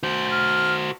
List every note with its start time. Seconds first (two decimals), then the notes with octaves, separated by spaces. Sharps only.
0.03 F#4 C5 G6
0.31 F6